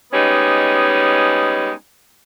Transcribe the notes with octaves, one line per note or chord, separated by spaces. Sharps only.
G3 G#3 B3 C#4 D#4